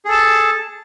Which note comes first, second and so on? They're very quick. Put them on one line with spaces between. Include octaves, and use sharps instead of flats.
G#4 A4 A5